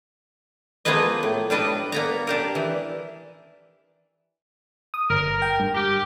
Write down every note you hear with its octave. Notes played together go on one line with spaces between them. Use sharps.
F3 A#3 B3 G#4 B4 D#5
A2
G3 D4 B4 D#5
A#3 B3 A#5
D4 G4 A#4
E3
D#6
G1 A#4
G5
G2
G4